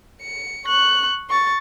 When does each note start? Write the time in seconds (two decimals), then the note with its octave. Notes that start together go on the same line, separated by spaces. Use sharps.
0.22 C#7
0.65 C#6 F#6
1.30 C#6 A6